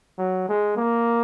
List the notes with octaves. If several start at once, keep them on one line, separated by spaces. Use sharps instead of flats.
F#3
G#3
A#3